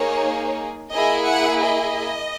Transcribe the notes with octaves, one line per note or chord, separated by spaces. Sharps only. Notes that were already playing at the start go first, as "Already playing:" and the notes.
Already playing: A#3 D#4 G#4 C#5
A#3 E4 G#4 D#5
F#5
D#5